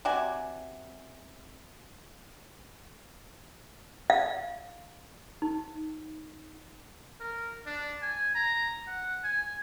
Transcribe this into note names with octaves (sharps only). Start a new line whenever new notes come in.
C3 F#4 D5 G#5
F5
D#4
A#4
D4
G#5
A#5
F#5
G#5